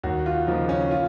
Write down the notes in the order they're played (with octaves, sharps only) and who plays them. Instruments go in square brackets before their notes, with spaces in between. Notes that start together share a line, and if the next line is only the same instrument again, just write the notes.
[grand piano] D#2 F#4
F4
C#3 F3 A#3 D#4
C#4
F4